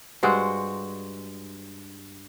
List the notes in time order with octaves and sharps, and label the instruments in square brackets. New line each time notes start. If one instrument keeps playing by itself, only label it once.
[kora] G2 G#3 F#4 C5